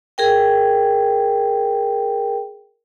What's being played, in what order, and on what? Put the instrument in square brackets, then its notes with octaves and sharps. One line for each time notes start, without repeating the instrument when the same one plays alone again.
[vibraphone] G#4 A#4 G5